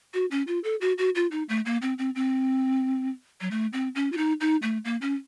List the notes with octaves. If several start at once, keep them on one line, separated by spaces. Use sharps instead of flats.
F#4
C#4
F4
A4
F#4
F#4
F4
D#4
A3
A#3
C4
C4
C4
F#3
A3
C4
C#4
F4
D#4
D#4
A3
A#3
C#4